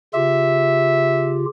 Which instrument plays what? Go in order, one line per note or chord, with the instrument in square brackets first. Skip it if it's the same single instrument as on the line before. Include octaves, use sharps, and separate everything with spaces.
[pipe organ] C#3 F4 G4 [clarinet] E5